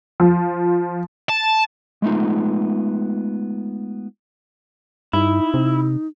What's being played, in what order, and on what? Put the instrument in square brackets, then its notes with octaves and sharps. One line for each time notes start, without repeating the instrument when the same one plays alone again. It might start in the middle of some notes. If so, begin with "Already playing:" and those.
[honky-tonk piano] F3
[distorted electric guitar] A5
[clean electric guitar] G#3 A3 B3 D#4 F4
[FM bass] G2 [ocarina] D#4 [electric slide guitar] E4
[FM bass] C3